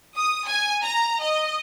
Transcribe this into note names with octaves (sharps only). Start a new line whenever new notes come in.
D#6
G#5
A#5
D#5